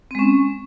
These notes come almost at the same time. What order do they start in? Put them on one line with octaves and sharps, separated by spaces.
C4 G#3 C#4